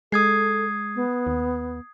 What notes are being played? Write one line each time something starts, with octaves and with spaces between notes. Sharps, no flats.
G#3 A4 D#6 G#6 C7
B3
D#2